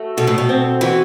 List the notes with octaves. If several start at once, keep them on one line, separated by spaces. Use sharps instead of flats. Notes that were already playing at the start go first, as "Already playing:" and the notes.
Already playing: A3 F#4
B2 A4
A2
B2
C4
E3 F#4